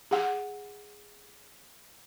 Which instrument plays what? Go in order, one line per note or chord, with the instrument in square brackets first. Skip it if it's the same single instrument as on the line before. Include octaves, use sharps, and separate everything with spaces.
[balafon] G#4 F#5